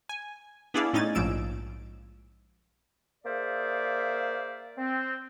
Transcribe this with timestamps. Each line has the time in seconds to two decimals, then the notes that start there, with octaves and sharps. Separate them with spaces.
0.09 G#5
0.74 B3 D4 E4 G#4 D5 F5
0.93 A2 C#4 D#4 G#5 A6
1.15 A#1 G#2 F3 E6 D7
3.24 A#3 G#4 C5 D5 E5 F5
4.77 C4